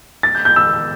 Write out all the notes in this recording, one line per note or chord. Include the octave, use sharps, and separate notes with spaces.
A6
G6
G6
E6